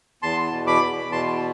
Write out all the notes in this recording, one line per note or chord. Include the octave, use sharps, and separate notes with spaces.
E2 A5 C6
B2
B5 D6
E2
B2 A5 C6